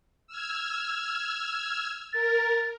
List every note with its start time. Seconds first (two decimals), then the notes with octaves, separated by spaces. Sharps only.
0.27 E6 F6 G#6
2.13 A#4 A6